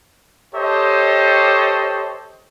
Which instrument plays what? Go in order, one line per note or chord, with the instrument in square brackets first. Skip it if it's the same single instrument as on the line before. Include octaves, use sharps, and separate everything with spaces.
[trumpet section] G4 A4 C5 C#5 D#5